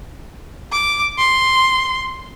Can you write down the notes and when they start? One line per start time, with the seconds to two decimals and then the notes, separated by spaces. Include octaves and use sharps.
0.72 D6
1.18 C6